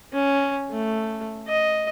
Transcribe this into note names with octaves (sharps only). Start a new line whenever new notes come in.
C#4
A3
D#5